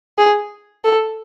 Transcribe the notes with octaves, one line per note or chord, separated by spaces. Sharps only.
G#4
A4